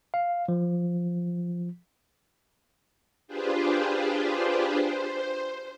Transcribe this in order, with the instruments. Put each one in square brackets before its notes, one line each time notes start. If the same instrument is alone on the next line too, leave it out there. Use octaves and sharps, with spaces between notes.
[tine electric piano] F5
F3
[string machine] D4 F4 G4 G#4 B4 C5
C5